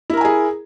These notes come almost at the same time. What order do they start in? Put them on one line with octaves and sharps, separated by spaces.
E4 A#4 A#5 G#5 G#4